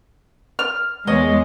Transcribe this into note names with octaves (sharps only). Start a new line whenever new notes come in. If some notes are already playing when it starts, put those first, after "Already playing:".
F6
E2 G#3 C#5 D#5